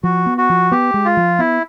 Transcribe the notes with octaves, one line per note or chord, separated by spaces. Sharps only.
F3 F#4
B3
F#4
F3
B3 G4
G#3
F4
F3
B3 E4